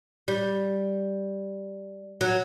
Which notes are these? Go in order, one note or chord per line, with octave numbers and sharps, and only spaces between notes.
G3
F#3